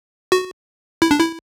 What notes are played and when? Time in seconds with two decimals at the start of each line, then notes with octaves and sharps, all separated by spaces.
0.32 F#4
1.02 E4
1.11 D4
1.20 E4